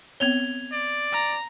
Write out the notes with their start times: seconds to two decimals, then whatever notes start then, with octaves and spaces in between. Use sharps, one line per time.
0.20 B3 C4 C#5 G#6 F7 G7
0.72 D5
1.12 A#5